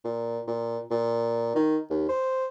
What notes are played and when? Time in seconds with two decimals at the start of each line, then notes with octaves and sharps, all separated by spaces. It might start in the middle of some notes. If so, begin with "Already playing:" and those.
0.05 A#2
0.47 A#2
0.91 A#2
1.55 D#3
1.90 D#2
2.09 C5